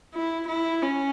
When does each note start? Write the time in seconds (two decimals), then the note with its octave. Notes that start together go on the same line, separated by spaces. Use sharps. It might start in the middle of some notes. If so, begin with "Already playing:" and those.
0.14 E4
0.48 E4
0.82 C#4